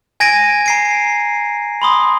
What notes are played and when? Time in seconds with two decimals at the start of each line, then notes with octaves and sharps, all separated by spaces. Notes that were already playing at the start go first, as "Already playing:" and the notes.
0.20 G#5 G#6 A#6 D7 D#7
0.66 A#5 C7 D7
1.82 B5 C6 D#6